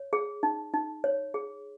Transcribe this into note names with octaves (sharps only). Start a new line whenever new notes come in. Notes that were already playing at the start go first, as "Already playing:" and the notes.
Already playing: C#5
G#4
D#4
D#4
C#5
G#4